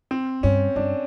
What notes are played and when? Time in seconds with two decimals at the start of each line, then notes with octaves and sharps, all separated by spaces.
0.11 C4
0.43 G2 C#4
0.76 G2 D4